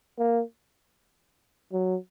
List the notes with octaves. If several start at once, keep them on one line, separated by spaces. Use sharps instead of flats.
A#3
F#3